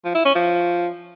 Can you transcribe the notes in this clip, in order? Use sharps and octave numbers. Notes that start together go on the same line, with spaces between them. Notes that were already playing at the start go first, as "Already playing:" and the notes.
F3
E4
C#4
F3